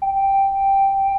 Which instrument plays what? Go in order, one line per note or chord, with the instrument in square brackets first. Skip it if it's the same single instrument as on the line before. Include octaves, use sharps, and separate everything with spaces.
[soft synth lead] G5